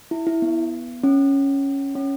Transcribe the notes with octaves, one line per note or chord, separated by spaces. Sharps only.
E4
E4
B3
C#4
C#4